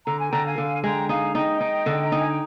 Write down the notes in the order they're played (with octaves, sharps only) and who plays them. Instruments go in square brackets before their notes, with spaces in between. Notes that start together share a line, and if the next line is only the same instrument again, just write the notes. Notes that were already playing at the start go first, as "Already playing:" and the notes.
[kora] D3 [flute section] A#5
[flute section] G#5
[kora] D3 [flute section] G5 A#5
[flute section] F5 G#5
[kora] D3
[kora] G#3 [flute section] G5 A#5
[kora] D#4 [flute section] F5 G#5
[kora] D#4 [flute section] D#5 G5
[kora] D#4
D3
[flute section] A#5
[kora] D#4 [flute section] G#5
[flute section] G5